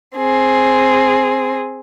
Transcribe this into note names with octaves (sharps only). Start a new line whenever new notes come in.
C4 G#4